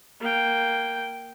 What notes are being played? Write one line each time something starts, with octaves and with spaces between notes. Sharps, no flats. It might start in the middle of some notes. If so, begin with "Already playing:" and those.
A#3 G5